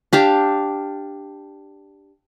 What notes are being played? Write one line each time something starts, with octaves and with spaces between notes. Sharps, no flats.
D4 G4 F5